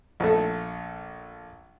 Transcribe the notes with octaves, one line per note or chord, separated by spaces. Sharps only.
A#1 A3